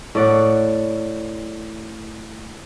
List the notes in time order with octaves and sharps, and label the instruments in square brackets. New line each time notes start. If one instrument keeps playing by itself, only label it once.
[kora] A2 D5 F#5